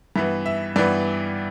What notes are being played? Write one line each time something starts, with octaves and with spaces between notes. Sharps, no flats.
G2 E3 B3 E5
E5
G2 E3 B3 D5